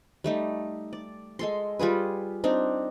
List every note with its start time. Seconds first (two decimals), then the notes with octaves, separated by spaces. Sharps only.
0.24 G3 A3 D#4
0.93 D5
1.39 G#3 A4 C6
1.79 G3 F4 G#4 B4
2.44 C4 D4 D#4